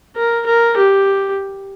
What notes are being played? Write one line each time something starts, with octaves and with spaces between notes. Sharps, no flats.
A#4
A#4
G4